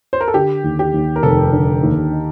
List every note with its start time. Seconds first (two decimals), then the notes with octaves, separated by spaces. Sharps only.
0.13 C5
0.21 A#4
0.28 A4
0.34 D3 G4
0.64 D#2
0.79 G4
0.94 D#2
1.16 A#4
1.23 F1 A4
1.53 D3
1.83 D#2
2.12 D#4